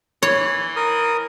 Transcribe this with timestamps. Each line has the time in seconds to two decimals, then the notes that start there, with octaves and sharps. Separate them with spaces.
0.23 E3 C#5
0.76 A#4 D#6